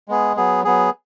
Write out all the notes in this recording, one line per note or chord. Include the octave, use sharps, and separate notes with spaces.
G#3 B3 G#4
F#3 B3 G#4
F#3 B3 G#4